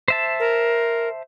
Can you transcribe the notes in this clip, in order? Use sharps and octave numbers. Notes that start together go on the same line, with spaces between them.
C5 E5 A5
A#4